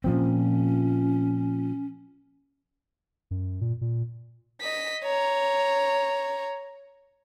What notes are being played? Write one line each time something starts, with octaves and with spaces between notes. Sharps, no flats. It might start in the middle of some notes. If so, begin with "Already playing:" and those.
A#2 F3 C4 C#4
F#2
A#2
A#2
D#5 B6
C#5 A#5